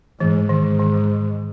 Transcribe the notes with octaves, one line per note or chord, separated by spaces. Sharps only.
G#2 E3
G#2 D#3
D#3